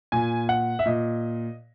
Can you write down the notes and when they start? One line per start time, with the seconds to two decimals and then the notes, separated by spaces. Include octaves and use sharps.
0.12 A#2 G#5
0.49 F#5
0.79 E5
0.86 A#2 D#5